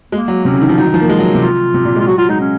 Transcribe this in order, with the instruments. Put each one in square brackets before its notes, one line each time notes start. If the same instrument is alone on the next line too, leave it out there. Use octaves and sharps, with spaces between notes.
[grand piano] G#3 [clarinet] A#3
[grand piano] F#3
[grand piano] C3 [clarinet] C#4
[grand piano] C#3
D#3
F3
[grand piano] F#3 [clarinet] D#4
[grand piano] D#3
F3
A#3
G#3
F#3
C3
[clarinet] F4
[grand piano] C3
A#2
G#3
[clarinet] F4
[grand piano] F#3 [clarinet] F#4
[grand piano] F#3 [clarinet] F4
[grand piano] G#3 [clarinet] D#4
[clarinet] C#4